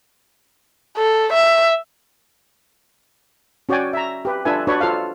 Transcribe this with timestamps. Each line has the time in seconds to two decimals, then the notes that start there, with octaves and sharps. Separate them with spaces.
0.97 A4
1.33 E5
3.69 C#4 F#4 C#5 D5 G5 G#5
3.93 E5 A#5
4.25 G4 B4
4.45 D4 F4 A4 B4 E5 G#5
4.67 D4 F#4 B4 C#5
4.81 F4 A4 C5 F5